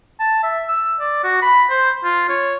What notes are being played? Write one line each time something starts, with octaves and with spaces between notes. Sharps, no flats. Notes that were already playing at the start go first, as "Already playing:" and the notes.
A5
E5
E6
D5
F#4
B5
C5
F4
C#5